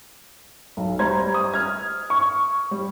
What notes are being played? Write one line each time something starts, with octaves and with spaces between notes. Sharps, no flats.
B1
G3 C5 A#5 G#6
D#6
F6 G#6
C#6
G3